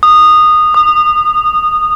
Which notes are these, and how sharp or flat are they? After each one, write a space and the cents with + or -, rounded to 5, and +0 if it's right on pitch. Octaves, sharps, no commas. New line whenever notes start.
D#6 -15
D#6 -30